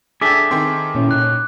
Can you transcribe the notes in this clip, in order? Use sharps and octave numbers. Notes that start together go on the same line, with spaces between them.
D4 G#4 A4 E5 G5 D6
D#3 C4 G5 C6
A#2 C#4 E4
A#2 C#5 F#6